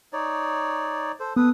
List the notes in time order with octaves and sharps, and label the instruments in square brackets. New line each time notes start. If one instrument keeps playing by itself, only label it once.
[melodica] D#4 C#5 D5
A4 C5
[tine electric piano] B3 [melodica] A4 B4 D#6